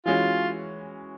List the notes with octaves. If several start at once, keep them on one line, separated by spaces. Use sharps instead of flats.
E3 G#3 C#4 F4 F#4